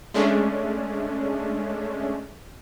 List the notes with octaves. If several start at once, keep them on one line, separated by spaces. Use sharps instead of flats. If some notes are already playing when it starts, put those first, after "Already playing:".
G#3 A3 C#4 D4